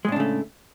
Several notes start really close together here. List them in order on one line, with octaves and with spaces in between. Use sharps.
G#3 A2 D4 C#3 A3